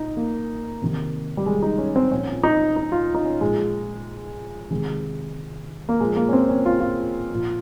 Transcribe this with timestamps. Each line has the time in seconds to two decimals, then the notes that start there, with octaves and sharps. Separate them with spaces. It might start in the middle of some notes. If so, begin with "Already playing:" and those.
Already playing: A#2 D#4
0.17 A#3
0.82 C3 D#3
1.37 G3
1.46 G#3
1.62 D#4
1.78 C#4
1.96 C4
2.11 A#2 F3 C#4
2.43 D#4
2.76 D#4
2.92 F4
3.15 D#4
3.25 C#4
3.41 A#2 F3 G#3
4.71 C3 D#3 G#3
5.89 A#3
6.00 A#2 F3 G#3
6.16 A#3
6.29 C#4
6.33 C4
6.49 C#4
6.66 F4
6.80 F4
7.30 A#2 F3